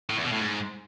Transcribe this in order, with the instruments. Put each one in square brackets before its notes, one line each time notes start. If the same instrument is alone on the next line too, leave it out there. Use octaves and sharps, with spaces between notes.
[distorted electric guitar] A2
E2
B2
A2
G#2